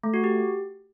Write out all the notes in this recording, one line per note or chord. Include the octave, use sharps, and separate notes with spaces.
A3
F#4
G4